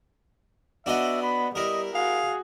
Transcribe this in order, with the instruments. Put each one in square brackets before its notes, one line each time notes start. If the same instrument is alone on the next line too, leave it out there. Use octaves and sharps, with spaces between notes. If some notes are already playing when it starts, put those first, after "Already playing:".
[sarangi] B3 [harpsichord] D4 F#4 D#5 [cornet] E5
[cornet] B5
[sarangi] G3 [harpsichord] E4 A#4 [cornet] D#5
[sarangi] F#4 [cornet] G#4 [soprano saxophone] F5